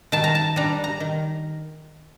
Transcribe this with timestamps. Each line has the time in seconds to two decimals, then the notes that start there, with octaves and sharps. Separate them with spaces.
0.12 D#3 A5
0.24 A#5
0.35 A5
0.56 G3 D4 A#5
0.84 A#5
1.00 D#3